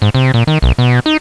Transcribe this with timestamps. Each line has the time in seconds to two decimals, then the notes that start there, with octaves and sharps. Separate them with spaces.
0.02 G#2
0.15 C3
0.34 A#2
0.47 D#3
0.62 B1
0.78 B2
1.06 D#4